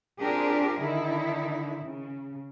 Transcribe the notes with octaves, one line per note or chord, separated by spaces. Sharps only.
C4 D4 F4 G4 G#4 A#4
D3 D#3 D#4 E4
C#3